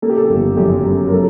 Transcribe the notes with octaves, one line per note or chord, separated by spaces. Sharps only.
A#3 A4
G4
A4
G1
F#2 G4
F#3
A#4
F#3 A4